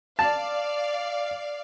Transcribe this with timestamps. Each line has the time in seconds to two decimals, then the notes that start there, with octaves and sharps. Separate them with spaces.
0.19 D5 F5 A5